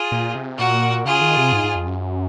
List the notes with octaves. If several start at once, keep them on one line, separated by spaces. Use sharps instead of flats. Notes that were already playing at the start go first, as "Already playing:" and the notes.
Already playing: F4 G#4
A#2
C3
A#2 F#4 A#4
C#3 F4 G#4
D#3
C3
G#2
G#2
F2
F#2